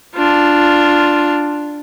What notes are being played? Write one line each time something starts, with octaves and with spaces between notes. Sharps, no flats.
D4 F4